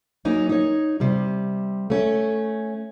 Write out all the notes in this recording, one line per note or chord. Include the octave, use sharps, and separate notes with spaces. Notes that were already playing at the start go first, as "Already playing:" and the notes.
F#3 A#3 C#4 D#4
D#4 C#5
C3 G3
A3 C#4